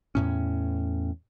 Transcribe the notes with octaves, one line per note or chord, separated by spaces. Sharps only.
E2 A2 C#4